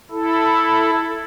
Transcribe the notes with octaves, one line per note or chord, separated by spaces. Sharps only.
E4 A4